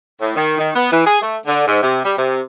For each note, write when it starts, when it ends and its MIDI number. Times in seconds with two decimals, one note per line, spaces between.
0.21 0.36 45
0.36 0.56 51
0.58 0.70 51
0.75 0.92 59
0.92 1.05 52
1.06 1.20 68
1.22 1.37 57
1.46 1.65 50
1.67 1.82 44
1.83 2.00 48
2.05 2.15 55
2.18 2.40 48